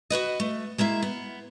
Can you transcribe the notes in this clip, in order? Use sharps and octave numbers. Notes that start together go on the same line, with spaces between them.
F#4 G4 B4 D#5
A3
G#3 A#3 E4 E5
B3